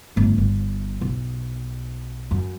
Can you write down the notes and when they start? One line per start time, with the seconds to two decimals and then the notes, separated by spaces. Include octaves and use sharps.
0.16 G1 A3
0.38 G1
1.01 B1
2.31 F#2